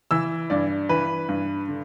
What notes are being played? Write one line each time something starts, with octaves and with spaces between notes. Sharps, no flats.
E3 E6
G2 D5
E3 B4
G2
D3